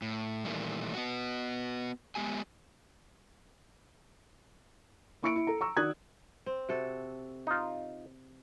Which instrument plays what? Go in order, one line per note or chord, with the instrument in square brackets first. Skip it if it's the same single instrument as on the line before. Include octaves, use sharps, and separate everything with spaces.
[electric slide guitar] A2
A#2 D#3 E3 G3 A3 A#3
B3 F#4
G#3 B3 G4 G#5
[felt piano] A#3 E4 C#6 E6 C#7 D7
E4
A4 A#5
A#5 C#6 E6
D#3 F#4 D5 D#6 F#6 G#6
[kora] C4
C3 F#4 A4
[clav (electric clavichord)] D#4 F4